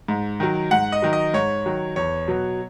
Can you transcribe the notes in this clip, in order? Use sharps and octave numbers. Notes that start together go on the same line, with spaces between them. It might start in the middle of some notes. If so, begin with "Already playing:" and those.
G#2
D#3 F#3
G#2 F#5
D#5
D#3 F#3
D#5
G#2 C#5
D#3 F#3
E2 C#5
B2 F#3